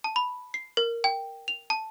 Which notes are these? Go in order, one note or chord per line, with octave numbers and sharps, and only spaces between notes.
A5
B5
C7
A#4
G5
F7
A5